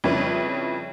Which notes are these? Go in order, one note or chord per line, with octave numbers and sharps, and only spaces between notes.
F2 C#3 G3 E4 B4 C#5